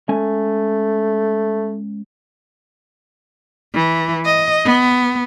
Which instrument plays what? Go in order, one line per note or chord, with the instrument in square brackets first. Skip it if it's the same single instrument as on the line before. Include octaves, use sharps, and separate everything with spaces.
[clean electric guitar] G#3 C#4 G#5 [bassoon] A3
[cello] E3
D#5
B3